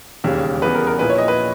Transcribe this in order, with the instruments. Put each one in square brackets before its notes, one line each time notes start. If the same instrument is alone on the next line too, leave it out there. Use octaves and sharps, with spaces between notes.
[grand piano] E1 D#2 C#3 G3
[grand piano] E2 C#3 G3 B3 [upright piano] B4
[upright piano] A#4
A#4
[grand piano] A#1 A#2 A#3 E4 [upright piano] B4
[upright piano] C#5
D#5
B4